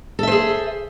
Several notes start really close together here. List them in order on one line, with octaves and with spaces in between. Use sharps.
A4 E5 C5 G#4